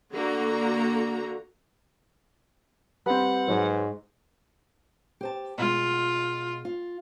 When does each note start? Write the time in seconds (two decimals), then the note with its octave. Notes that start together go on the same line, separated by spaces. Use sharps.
0.12 D3 A#3 F#4 A#5
3.06 G3 C4 B4 F#5
3.48 G#2 F#3
5.21 G4 C5 A5
5.58 B2 G#3 F4
6.65 F4